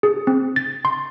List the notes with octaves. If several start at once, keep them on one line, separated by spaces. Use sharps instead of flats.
G#4
C4
A6
C6